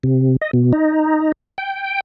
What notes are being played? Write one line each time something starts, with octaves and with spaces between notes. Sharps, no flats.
C3
D#5
B2
D#4
G5